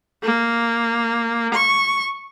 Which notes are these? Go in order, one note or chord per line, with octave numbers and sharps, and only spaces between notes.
A#3
C#6